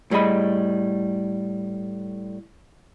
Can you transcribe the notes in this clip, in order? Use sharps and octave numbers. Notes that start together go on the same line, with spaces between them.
A2 G3 G#4 D#5 B5